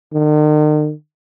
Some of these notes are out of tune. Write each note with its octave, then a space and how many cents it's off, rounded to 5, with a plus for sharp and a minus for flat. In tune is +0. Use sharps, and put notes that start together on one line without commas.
D#3 -45